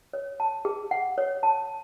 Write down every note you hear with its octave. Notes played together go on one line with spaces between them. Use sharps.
C#5
A5
G#4
F#5
C#5
A5